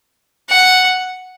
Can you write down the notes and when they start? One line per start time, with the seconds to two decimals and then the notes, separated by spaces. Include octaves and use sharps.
0.49 F#5